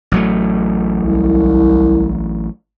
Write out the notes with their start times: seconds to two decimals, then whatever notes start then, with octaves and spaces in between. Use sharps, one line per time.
0.12 A1 F#3 A3
0.98 C2